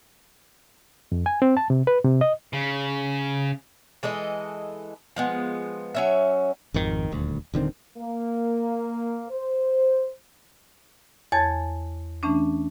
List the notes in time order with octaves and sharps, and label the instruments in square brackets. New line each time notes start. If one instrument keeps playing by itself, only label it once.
[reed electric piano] F2
G#5
C4
A5
C3
B4
C3
D#5
[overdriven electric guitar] C#3
[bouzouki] E3 G#3 A4 D#5
F3 G#3 B3
F#3 C#4 E5
[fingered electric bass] G#1 F2 D#3
D#1 D2
D#1 D3 D#3 C4
[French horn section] A#3
C5
[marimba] E2 C#5 G#5 A5 G#6 A6
E3 A3 C#4 D4